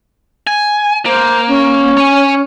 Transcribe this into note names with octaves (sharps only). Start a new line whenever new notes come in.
G#5
A#3 C5
C#4
C#5 G#5